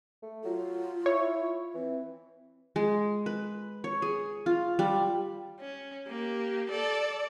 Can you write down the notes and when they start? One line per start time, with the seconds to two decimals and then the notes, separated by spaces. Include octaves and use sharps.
0.22 A3
0.44 F#3 F4
1.06 E4 C#5
1.74 E3 C4
2.76 G#3
3.26 B4
3.84 C#5
4.02 G#4
4.46 F4
4.79 G3
5.60 C#4
6.08 A#3 G4
6.70 A4 D5